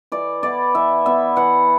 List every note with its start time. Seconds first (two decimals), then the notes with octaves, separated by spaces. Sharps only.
0.12 E3 D5
0.43 B3 E4 D5
0.75 E3 E5
1.06 B3 E4 E5
1.36 E3 F#5